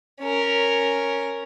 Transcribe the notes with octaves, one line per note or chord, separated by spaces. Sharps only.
C#4 A#4